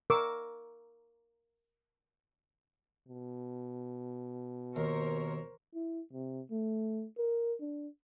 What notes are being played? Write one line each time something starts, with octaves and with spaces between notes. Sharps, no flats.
A#4 C#6 D6 E6
B2
D#2 A#4 C5 C#5
E4
C3
A3
A#4
D4